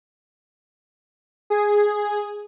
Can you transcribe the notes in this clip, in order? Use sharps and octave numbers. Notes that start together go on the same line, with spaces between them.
G#4